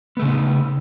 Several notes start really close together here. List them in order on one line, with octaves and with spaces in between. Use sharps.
B3 A3 C#3 D#4